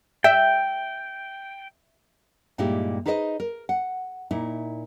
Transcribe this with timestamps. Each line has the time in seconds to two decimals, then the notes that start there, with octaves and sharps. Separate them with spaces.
0.24 E5 G5
2.58 G2 A#2 G#3 D#4 E4 G4
3.06 D#4 G#4 B4 C5 D5 D#5
3.40 A#4
3.69 F#5
4.31 A#2 D#4 E4